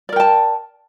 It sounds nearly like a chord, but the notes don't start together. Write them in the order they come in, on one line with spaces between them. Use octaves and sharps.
D5 A#4 G5 A5